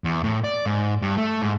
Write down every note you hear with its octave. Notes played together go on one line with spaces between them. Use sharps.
E2
A2
D5
G#2
G2
A3
G#2